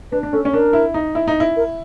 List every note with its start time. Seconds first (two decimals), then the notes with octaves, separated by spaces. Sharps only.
0.12 D4 B4
0.23 D4
0.33 C#4 A4
0.45 C#4
0.53 D4 A#4
0.73 E4
0.94 D#4
1.15 E4
1.27 D#4
1.40 E4
1.57 A#4